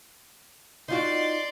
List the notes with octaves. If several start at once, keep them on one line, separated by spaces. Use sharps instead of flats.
D#4 F4 F#4 D5 C6